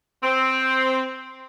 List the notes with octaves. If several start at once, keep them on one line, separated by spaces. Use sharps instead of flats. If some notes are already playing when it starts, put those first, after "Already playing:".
C4